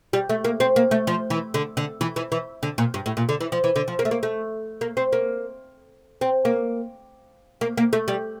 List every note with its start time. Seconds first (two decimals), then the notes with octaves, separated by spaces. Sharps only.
0.13 G3
0.29 A3
0.44 A#3
0.60 C4
0.76 A#3
0.91 A3
1.07 F3
1.30 E3
1.54 D3
1.77 D3
2.01 E3
2.16 E3
2.32 E3
2.63 D3
2.78 A#2
2.94 G2
3.06 A2
3.17 A#2
3.29 D3
3.41 E3
3.52 F3
3.64 E3
3.76 D3
3.88 F3
3.99 A#3
4.05 A3
4.11 A#3
4.23 A3
4.81 A#3
4.97 C4
5.13 A#3
6.21 C4
6.45 A#3
7.61 A#3
7.77 A#3
7.93 A3
8.08 G3